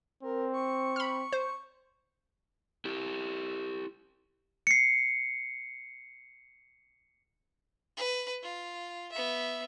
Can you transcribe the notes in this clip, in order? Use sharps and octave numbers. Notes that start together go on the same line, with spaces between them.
C4 A#4
C#6
B5 F6
C5
E4 G4
C7 C#7
B4
F4
B3 E5